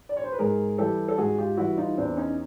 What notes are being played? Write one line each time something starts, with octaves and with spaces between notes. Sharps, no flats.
D5
C#5
C5
B4
G#2 G#4 A#4
E3 G3 G4 A4
A4
G#2 F#4 G#4
F4 G4
E3 G3 E4 F#4
D#4 F4
E2 C4 D4
C#4 D#4